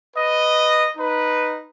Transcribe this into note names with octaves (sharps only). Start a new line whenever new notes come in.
B4 D#5
D#4 B4